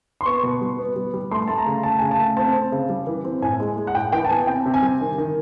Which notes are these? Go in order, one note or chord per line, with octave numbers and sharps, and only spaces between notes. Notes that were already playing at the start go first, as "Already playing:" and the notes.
C6
B3 C#6
B2
G3
B3
G3
G3
A3 C6
A3 A5
A#5
C#3
A3 A5
C#3 G#5
A5
A3
C4 A5
C4
C#3
G3
E3
C4
A2 G#5
G#3
G#3
F#5
A2 G5
E3 G5
A5
B3 G#5
C3 G5
C3
G#5
G3
D#3
D#3